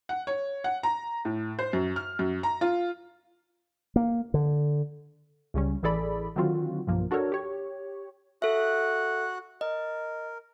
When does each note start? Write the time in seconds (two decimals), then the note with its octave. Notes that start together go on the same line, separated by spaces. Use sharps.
0.09 F#5
0.27 C#5
0.64 F#5
0.83 A#5
1.25 A2
1.59 C5
1.73 F#2
1.96 F6
2.19 F#2
2.43 A#5
2.61 F4
3.96 A#3
4.34 D3
5.54 C#2 C#3 G3 C#4
5.83 A1 E3 G#4 A4 D5 B5
6.36 D3 D#3 F#3 C4 F4 F#4
6.87 B1 G2 F3 A#3
7.11 D4 F#4 A4 A#4 C#5
7.32 G4 C#5
8.42 F#4 A4 E5 F#5 F#6
9.61 A#4 D#5